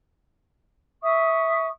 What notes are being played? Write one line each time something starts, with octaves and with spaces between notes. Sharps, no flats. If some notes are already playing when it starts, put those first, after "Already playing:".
E5 C#6 D#6